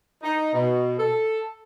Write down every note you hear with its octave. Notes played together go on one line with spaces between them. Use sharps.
D#4
B2
A4